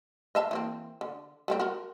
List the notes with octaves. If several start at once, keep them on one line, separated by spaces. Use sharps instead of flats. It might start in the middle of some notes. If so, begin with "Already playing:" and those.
D#5 E5 A5
E3 A#3 C4
D3
G3 A3 C4
F#4 A#4